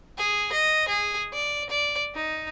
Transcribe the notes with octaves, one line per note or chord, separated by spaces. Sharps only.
G#4
D#5
G#4
D5
D5
D#4